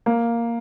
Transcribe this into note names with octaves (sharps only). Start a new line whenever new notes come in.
A#3